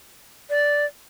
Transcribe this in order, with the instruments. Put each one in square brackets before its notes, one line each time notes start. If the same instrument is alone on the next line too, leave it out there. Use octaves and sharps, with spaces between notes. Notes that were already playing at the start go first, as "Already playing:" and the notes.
[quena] D5